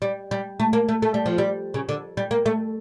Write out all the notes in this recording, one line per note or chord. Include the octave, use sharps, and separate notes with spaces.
G3
G3
A3
A#3
A3
A3
G3
F3
G3
C#3
D3
G3
A#3
A3